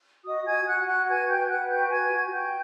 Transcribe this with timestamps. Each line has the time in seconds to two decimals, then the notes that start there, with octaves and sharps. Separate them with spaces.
0.25 F#4 D#5 D#6
0.46 F#4 G#5 G#6
0.66 F#4 F#5 F#6
0.86 F#4 F#5 F#6
1.08 B4 G#5 G#6
1.28 B4 G5 G6
1.49 B4 F#5 F#6
1.69 F#4 G5 G6
1.90 B4 G#5 G#6
2.12 F#4
2.31 F#4 G5 G6